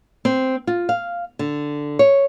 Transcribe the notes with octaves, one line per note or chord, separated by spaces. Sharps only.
C4
F4
F5
D3
C#5